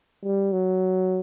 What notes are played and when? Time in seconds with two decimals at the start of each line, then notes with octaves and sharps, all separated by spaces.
0.24 G3
0.52 F#3